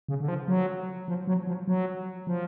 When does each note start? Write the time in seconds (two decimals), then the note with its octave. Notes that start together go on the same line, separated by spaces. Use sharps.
0.09 C#3
0.20 D3
0.28 F3
0.48 F#3
1.08 F3
1.27 F#3
1.47 F3
1.68 F#3
2.27 F3